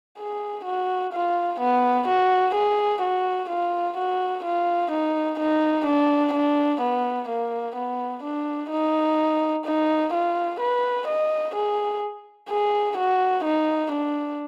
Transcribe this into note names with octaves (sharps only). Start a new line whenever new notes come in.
G#4
F#4
F4
B3
F#4
G#4
F#4
F4
F#4
F4
D#4
D#4
D4
D4
B3
A#3
B3
D4
D#4
D#4
F4
B4
D#5
G#4
G#4
F#4
D#4
D4